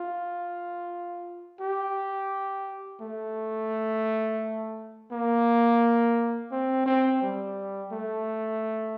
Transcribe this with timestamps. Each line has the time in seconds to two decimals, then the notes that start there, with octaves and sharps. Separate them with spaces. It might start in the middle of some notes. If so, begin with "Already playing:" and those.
Already playing: F4
1.60 G4
3.01 A3
5.11 A#3
6.51 C4
6.86 C4
7.22 G3
7.92 A3